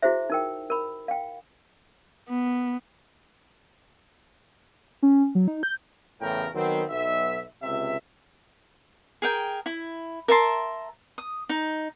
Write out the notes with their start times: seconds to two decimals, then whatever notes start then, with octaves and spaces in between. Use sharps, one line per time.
0.02 E4 F#4 G#4 C5 E5
0.30 D#4 A#4 G5
0.70 A#4 B5
1.08 F5 G5
2.29 B3
5.03 C#4
5.35 F#3
5.48 D#4
5.63 G6
6.20 E2 A2 C#3 A#4 G5
6.54 D#3 F#3 B3 C4
6.88 B1 E5
7.62 C#2 C3 E5
9.22 G#4 A#4 G5
9.66 E4
10.28 A#4 E5 A5 C6
11.18 D#6
11.49 D#4